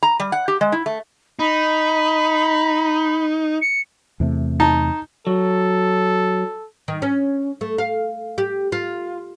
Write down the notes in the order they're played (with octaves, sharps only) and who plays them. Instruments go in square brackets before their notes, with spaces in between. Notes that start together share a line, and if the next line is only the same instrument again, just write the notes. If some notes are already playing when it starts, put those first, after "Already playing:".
[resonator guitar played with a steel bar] A#5
G3
F#5
G4
G#3
E4
A3
[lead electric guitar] D#4 [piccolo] B5
[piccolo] C#7
[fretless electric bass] E2 C3 A3
[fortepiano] D#4 A5
[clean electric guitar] F#3 [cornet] A4
[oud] D#3
C#4
A3
F5
G4
F4